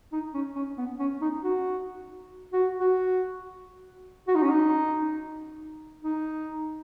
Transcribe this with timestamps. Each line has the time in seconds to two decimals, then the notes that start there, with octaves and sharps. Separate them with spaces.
0.12 D#4
0.34 C#4
0.55 C#4
0.78 B3
1.00 C#4
1.21 D#4
1.43 F#4
2.53 F#4
2.80 F#4
4.28 F#4
4.35 D#4
4.43 C#4
4.50 D#4
6.03 D#4